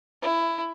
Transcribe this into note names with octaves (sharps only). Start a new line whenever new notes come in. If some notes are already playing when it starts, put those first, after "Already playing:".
E4